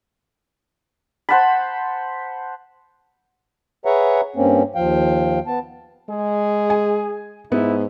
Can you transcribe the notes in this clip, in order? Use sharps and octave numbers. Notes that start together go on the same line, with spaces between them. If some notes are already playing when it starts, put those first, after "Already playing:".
C5 F#5 A5 B5
G#4 B4 C#5 E5 F#5 A#5
G2 A#3 C4 C#4
D#2 F3 F5 G5
B3 A5
G#3 G#4
G#5
G#2 B3 E4